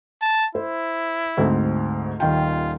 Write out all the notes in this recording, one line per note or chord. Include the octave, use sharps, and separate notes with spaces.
A5
E4 C5
D2 G#2 C4
D#1 D#3 F4 G5